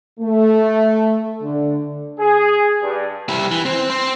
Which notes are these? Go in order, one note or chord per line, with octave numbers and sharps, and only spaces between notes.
A3
D3
G#4
G2
G3 E4
E3
C4
C4